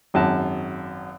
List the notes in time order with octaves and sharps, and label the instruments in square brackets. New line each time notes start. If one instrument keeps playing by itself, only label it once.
[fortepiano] G#1 F#2 A5